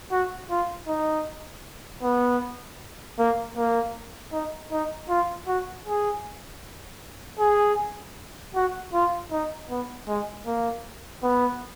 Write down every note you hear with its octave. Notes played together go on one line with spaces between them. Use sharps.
F#4
F4
D#4
B3
A#3
A#3
D#4
D#4
F4
F#4
G#4
G#4
F#4
F4
D#4
B3
G#3
A#3
B3